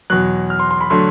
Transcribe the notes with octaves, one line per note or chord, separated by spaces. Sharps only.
E2 B2 F#3 F#6
F6
C6
C6
B5
D3 F#3 A3 C6